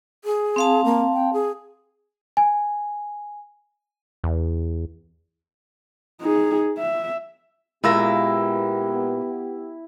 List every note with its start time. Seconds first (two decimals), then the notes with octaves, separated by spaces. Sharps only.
0.24 G#4
0.56 C4 F5 A5
0.85 A#3
1.14 G5
1.33 G#4
2.37 G#5
4.24 E2
6.21 D#4 G#4
6.78 E5
7.84 A#2 G#3 A#3 B3 E4 G4 E6 A#6